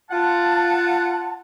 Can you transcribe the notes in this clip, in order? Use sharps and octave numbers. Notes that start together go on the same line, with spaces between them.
F4 F#5 A5